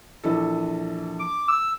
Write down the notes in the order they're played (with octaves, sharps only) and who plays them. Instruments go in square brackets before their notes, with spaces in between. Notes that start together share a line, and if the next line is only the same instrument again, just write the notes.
[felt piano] A#1 E3 A4
[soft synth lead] D6
E6